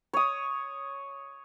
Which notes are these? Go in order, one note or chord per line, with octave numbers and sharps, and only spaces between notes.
C#5 D#6